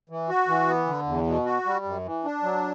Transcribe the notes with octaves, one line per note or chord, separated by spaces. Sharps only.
E3
F#4
E3
B3
D3
E2
B2
F#4
G3
F#2
E3
D4
F#3